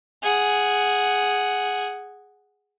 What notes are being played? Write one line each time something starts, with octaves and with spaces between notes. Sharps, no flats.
G#4 F#5